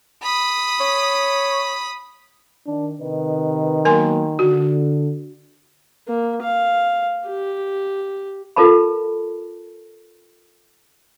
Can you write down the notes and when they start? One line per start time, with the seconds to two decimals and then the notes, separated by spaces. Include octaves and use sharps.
0.23 B5 D#6
0.80 C#5
2.66 D#3 D4
3.00 C3 D#3 B4 D#5
3.85 F#3 A#3 B3 A#4 G#5 C6
4.39 D3 F#4
6.08 A#3
6.43 F5
7.27 G4
8.56 F4 A4 A#4 A5 B5